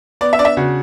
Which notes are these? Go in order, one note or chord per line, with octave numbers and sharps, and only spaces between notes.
B3 D5
E5
D4 D5
E5
C#3 F#4